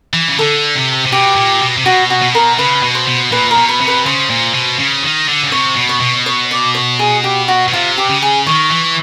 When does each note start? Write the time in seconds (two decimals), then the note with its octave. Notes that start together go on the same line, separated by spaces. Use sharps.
0.13 E3
0.28 C#3
0.39 D3 A4
0.75 C3
1.06 C3
1.12 B2 G4
1.36 A#2
1.61 B2
1.77 C3
1.85 B2 F#4
2.10 F#4
2.22 B2
2.35 A#4
2.59 C#3 B4
2.83 B2
2.95 C5
3.07 B2
3.32 A#2 B4
3.51 A#4
3.57 B2
3.69 B4
3.80 C3
3.87 B4
4.06 C#3 C5
4.30 A#2
4.54 B2
4.79 C#3
5.03 D#3
5.28 D3
5.43 C#3
5.52 C3 C#5
5.77 B2
5.89 C#5
6.01 B2
6.26 C#5
6.51 D5
6.75 C#5
6.99 G#4
7.24 G4
7.48 F#4
7.68 B2
7.73 C3 F4
7.98 G4
8.09 C#3
8.22 G#4
8.46 D#3 C#5
8.71 E3